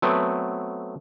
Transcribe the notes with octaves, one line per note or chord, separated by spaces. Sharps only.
F#3 A3 B3 C4